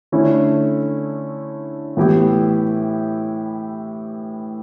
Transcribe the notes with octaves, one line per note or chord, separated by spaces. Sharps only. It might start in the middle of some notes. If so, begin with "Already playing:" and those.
D3 A3 C#4 E4
A2 E3 B3 E4 G4